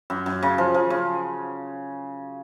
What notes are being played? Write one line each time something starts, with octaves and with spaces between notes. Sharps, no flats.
F#2
F#2
C#3
F3
F3
C#3